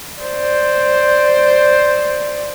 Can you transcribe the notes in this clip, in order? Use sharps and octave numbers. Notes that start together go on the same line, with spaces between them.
C5 D5